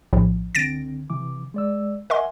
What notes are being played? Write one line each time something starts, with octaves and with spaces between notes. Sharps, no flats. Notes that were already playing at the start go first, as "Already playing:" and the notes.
A#1 A2 F3
C#2 D3 C4 A6 A#6 D7
C3 E3 D6
G#3 D5 E6
A#4 D#5 E5 F#5 G#5 C6